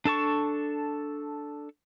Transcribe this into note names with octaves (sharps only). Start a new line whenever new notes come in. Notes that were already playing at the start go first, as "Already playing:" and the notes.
D4 A4 A5 C#6